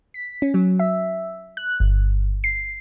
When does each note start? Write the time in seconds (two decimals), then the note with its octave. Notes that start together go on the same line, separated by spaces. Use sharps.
0.14 B6
0.42 C#4
0.54 F#3
0.80 E5
1.57 F#6
1.80 G1
2.44 C7